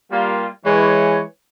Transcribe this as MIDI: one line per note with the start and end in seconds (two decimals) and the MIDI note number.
0.12 0.48 55
0.12 0.48 58
0.12 0.48 65
0.66 1.24 52
0.66 1.22 56
0.66 1.24 73